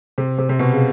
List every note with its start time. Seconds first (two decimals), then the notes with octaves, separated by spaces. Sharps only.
0.18 C3
0.38 C3
0.49 C3
0.59 B2
0.72 C#3